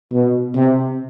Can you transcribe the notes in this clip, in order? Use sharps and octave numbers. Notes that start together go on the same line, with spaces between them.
B2
C3